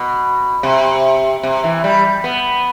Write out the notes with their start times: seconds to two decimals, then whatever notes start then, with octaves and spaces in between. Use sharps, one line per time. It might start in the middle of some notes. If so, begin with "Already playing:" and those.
Already playing: B2
0.63 C3
1.43 C3
1.64 E3
1.84 G3
2.24 B3